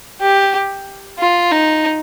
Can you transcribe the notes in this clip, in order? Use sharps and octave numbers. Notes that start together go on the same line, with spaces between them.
G4
F4
D#4